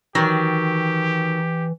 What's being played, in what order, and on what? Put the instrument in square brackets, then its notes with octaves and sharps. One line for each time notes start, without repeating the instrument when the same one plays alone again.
[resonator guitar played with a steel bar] D#3 F#3 [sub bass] E3 [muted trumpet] G4